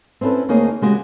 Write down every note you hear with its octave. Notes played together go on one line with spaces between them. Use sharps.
C4 C#4 E4 A4 B4
D2 A#3 D#4 G#4 C#5
C#3 G#3 F#4 G4